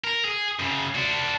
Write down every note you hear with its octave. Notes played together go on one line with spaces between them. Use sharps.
A#4
G#4
F#2 C#3
D4 F#4